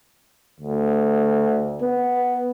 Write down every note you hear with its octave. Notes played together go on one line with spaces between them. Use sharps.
D2
B3